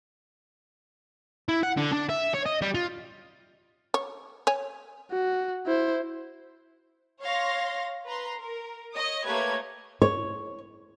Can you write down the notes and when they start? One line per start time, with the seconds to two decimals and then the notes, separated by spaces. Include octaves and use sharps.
1.48 E4
1.63 F#5
1.77 D3
1.93 D4
2.10 E5
2.34 C#5
2.46 D#5
2.62 G3
2.74 F4
3.94 C#5
4.47 C#5 G#5
5.12 F#4
5.67 E4 C5
7.21 C#5 F5 C6 A#6
8.05 B4 A#5 C6
8.36 A#4
8.93 C#5 D#5 D#6
9.25 A3 A#3 G4 B4 C#5 G#6
10.02 C#5